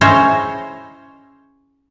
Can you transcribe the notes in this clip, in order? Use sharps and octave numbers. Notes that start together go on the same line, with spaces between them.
C#4 E4 G#4 C5 C#5 D#5